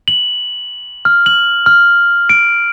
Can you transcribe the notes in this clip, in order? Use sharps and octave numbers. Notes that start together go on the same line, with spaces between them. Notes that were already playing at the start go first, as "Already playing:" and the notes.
F#7
F6
F#7
F6
D7